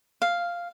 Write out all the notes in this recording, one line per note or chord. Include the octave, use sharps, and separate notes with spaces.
F5